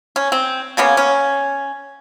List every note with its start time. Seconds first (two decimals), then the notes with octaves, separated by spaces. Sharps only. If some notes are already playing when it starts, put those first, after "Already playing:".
0.16 C#4
0.32 C4
0.77 C#3 A#3 B3 C#4
0.97 C#4